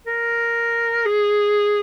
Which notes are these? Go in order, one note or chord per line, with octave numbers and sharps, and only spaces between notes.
A#4
G#4